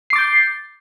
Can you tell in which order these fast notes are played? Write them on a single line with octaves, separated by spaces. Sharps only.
C7 D6 A6 G6